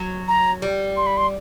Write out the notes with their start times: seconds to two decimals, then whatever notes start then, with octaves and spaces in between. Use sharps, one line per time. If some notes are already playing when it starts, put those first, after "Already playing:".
Already playing: F#3
0.28 A#5
0.62 G3
0.97 C6
1.06 B5
1.17 C6